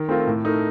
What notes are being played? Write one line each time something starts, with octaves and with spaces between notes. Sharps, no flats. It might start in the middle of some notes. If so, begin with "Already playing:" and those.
Already playing: D#3
A3 C4 F4 A#4
A2
A3 D#4 A#4